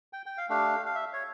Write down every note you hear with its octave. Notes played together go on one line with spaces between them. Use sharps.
G5
G5
F5
A3 D4 G4 F5
F5
E5
C#5